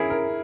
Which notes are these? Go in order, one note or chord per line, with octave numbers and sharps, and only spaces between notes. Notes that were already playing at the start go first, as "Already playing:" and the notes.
Already playing: C#4 E4 G#4 A#4
A#4